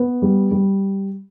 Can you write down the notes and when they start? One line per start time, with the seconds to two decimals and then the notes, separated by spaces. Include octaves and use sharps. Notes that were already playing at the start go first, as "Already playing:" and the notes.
Already playing: B3
0.22 G3
0.51 G3